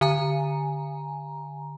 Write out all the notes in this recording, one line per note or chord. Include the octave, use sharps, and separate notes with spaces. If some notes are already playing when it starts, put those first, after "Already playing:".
D3 G#5 A#5